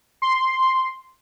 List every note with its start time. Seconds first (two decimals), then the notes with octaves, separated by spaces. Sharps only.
0.22 C6